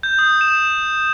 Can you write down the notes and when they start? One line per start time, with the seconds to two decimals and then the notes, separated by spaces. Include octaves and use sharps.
0.03 G6
0.19 D#6
0.41 E7